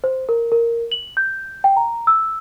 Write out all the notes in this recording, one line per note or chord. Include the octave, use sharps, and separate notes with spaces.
C5
A#4
A#4
F#7
G6
G5
A#5
E6